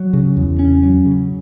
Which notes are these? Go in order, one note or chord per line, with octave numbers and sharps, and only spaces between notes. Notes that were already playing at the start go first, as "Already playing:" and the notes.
Already playing: F#3
C#3
E2
C#4
F#3
C#3